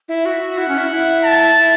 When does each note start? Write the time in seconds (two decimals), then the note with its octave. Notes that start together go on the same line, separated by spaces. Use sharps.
0.08 E4
0.25 F#4 E5
0.58 E4 F#5
0.68 C#4
0.78 E4
0.91 E4
1.24 A5
1.58 E4